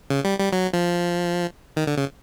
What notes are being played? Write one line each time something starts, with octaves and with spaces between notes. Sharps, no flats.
C#3
G3
G3
F#3
F3
D#3
D3
C#3